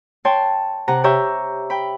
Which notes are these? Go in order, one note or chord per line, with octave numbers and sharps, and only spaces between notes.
C#5 G5 A5 C6
C3 F#5 A#5
G4 C#5 E5 A#5 C#6 G6
G5 B5